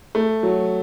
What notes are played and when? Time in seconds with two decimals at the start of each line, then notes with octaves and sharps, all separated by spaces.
0.15 A3
0.43 F#3